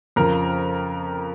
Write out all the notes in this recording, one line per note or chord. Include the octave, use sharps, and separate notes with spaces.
F2 C#3 F3 A#4